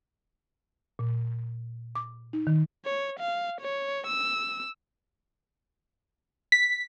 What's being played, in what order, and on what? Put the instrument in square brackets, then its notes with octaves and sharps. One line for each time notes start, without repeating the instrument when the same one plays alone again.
[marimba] A#2
D6
D#4
D#3
[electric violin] C#5
F5
C#5
E6
[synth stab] B6